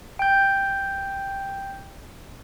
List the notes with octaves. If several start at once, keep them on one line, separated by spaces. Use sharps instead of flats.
G5 G6